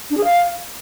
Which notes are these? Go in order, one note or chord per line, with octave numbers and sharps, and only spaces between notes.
D4
G#4
F5